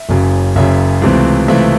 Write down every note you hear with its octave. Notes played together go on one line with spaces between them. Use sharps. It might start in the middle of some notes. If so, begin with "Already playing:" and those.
Already playing: E5
F#1 F#2 C#3
F#1 F#2 C#3 E5
C#2 C3 E3 A3 C4
C#2 C3 E3 A3 C4 E5